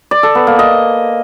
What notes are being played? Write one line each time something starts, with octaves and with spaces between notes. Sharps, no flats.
D5
A4
B3
A#3
D#5